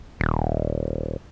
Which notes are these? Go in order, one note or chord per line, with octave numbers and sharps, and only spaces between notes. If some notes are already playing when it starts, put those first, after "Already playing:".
D#1